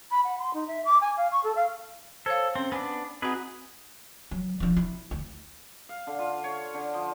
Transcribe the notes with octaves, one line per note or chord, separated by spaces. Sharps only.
B5
F#5
C6
D#4
E5
D6
G#5
F5
C#6
A4
F5
A4 C5 C#5 F5
C4 C#4
B3 D4 G#5
C4 D#4 F#4 G#4 B4 F#5
F#3
F3 D4
E4
D2
F5
D3
F4
C#5
D3
F3